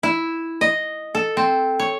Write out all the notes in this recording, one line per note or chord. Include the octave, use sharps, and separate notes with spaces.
E4
D#5
A4
C4
C#5